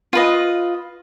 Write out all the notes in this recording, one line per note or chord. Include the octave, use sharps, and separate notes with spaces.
F4 B4 D#5